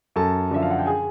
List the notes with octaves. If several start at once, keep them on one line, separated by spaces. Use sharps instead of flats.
F#2 A4 A5
D3 F3 E5
F5
F#5
G5
G#4 G#5